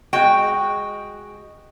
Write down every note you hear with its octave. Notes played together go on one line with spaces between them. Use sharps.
G#3 F#4 G5